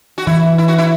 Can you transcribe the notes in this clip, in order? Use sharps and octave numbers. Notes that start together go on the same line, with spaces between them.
F#4
E3 E4
E4
F#4
E4